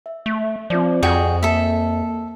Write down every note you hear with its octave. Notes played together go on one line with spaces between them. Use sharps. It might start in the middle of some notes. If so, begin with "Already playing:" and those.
E5
A3
F3 C4 F4 D5
F2 F#4 G#4 G5
A#3 A4 E5